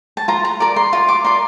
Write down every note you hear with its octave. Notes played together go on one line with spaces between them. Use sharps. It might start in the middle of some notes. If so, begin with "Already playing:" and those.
A5
F4 A#5
A#5
A#4 D5
C6
F4 C6
D6
A#4 D5 C6